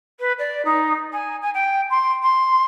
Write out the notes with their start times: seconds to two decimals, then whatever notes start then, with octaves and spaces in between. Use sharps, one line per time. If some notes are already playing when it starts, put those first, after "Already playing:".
0.20 B4
0.39 D5
0.65 D#4
1.12 G#5
1.41 G#5
1.54 G5
1.90 C6
2.22 C6